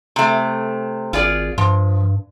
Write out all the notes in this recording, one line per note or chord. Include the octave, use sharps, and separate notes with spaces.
C3 A3
G#1 F4 G#4 D5
G2 F3